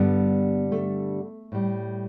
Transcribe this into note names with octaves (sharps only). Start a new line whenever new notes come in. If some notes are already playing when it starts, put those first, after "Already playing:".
Already playing: G2 D3 G3 B3
A3
A2 G3